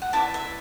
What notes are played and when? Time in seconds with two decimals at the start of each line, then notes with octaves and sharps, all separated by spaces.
0.02 F#5
0.13 E4 B4 D5 E5 A5
0.34 E5